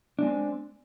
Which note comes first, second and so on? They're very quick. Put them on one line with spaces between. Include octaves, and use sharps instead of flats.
D4 G#3 C4